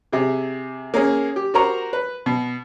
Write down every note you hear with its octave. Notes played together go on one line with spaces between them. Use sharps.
C3 G4 G#4
A#3 C#4 G#4
G4
F#4 G4 A#4 C5 A#5 C#6
B4
B2